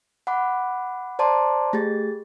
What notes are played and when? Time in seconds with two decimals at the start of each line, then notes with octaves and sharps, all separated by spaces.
0.27 F#5 B5 D6
1.19 C5 D5 A5 A#5 C6 D6
1.73 A3 G4 G#4 A6